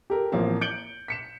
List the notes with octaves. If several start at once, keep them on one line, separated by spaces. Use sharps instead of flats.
G4 A4 A#4
A1 F3 A#3 C4
G6 C#7 D7 F#7 G7
B6 C#7 E7